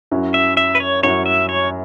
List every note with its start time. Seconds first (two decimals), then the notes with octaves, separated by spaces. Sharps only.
0.11 F#2 F#3 C#4 E4
0.34 E5
0.57 E5
0.75 B4
0.80 C#5
1.03 F#2 F#3 C#4 E4 C#5
1.26 E5
1.49 C#5